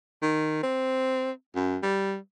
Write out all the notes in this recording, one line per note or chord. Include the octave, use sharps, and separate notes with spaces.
D#3
C4
F#2
G3